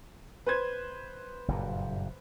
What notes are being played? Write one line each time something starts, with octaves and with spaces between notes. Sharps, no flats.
B4 C5 G#6
F#1 G2 A#2